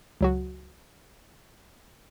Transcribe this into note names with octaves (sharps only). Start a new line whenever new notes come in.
C#2 F#3 F#4